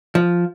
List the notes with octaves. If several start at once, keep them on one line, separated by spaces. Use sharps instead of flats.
F3